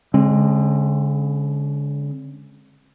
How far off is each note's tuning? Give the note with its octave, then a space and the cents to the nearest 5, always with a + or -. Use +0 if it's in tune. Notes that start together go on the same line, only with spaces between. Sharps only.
D3 -40 G#3 +0 C4 +40